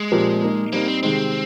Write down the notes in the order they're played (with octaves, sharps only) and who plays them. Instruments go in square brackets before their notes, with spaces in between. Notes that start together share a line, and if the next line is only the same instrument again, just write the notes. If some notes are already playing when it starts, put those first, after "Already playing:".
Already playing: [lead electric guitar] G#3
[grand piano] A#2 F3 C4 G4 A#4
A#3 D#4 A#4
[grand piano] G3 C4 D#4 [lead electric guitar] A#3
[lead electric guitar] C4
[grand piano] C3 D#3 G#3 [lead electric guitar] C4